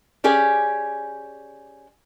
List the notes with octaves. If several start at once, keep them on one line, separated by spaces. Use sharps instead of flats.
C#4 G4 G#4 D5